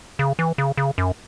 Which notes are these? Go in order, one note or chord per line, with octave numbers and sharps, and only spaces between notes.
C#3
E3
C#3
C#3
F#2